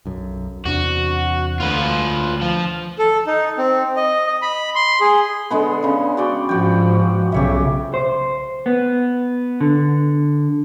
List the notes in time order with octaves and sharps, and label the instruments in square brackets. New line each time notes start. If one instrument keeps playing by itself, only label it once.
[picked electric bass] B1 F#2
[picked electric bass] E2 C3 D4 [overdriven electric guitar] F#4
[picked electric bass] D2 [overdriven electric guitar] F4 B4
[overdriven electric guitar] F3
[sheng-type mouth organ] A4
D#4
C4
D#5
D#5
B5
C6
G#4
[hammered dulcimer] D3 G#3 B3
C#3 C#6
F#4 D5 G5
[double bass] G#2 F3 [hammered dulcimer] F#4 G5
[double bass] B1 C#3 [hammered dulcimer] G4 C#5 E5
[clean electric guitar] C5
B3
D3